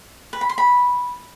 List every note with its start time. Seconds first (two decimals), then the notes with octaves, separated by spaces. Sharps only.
0.33 B4
0.41 B5
0.49 C6
0.58 B5